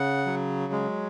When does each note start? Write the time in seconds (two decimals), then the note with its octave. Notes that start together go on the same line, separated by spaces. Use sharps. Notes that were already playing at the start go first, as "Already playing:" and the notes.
Already playing: C#3 F#5
0.26 F#3
0.72 G#3